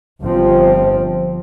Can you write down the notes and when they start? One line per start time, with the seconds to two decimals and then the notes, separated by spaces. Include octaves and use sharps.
0.21 G1 F3 C4